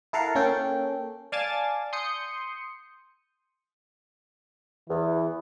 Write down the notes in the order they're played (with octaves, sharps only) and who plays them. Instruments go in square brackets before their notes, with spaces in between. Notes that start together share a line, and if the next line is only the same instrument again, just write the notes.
[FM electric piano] E4 A4 A#4 F5 F#5
A#3 C#4 A4 G5
D5 F5 G#5 A5 D6 A6
C6 D#6 G6 C#7
[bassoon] E2 [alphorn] E3